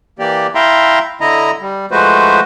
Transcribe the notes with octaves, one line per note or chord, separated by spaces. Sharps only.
E3 A#3 G4 D5
E4 E5 F5 G5 A#5 C6
D3 E4 D#5 A#5
G3
F3 G#3 A3 F#4 B4 C5